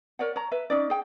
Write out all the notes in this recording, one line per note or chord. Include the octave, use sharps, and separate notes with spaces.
A#4 C#5 D5 F#5
C#5 A#5
B4 E5
C#4 D#4 D5
G#4 G5